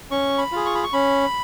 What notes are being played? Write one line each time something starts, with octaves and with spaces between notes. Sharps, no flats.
C#4 C#6
B5
F4 G#4
C#6
B5
C#6
C#4 B5